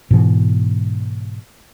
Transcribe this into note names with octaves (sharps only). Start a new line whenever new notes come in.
G#2 B2 E3